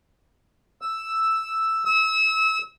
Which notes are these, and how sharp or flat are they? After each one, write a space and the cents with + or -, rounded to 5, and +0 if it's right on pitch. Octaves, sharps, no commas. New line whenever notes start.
E6 +0
E6 -30